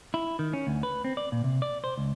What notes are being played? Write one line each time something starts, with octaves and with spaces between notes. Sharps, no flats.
E4
D#3
C#4
D2
B4
C4
D5
A#2
C3
D5
C5
C#2